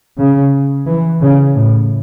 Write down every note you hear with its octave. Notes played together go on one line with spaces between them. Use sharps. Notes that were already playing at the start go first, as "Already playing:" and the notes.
C#3
E3
C#3
A2